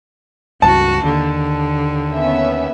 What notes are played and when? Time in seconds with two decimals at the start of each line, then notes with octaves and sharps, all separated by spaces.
0.62 C#2 G2 F#4 A5
1.04 D#2 D3
2.14 B3 C#4 E5